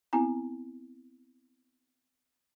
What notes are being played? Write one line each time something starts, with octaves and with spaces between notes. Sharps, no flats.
B3 C4 E4 G#5 A#5